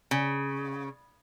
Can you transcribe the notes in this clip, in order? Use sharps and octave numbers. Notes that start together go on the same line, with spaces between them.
C#3